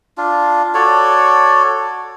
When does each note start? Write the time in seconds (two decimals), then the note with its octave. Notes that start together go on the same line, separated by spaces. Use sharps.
0.17 D4 F4
0.74 F#4 A4 C#5 D5